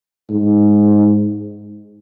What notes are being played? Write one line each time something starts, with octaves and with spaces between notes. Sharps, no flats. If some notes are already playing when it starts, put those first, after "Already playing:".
G#2